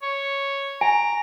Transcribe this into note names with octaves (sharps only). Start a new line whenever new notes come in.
C#5
G#5 A#5